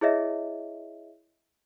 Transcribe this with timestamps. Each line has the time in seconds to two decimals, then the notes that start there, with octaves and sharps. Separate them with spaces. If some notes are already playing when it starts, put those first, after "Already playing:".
0.01 E4 G#4 C#5 D#5 E5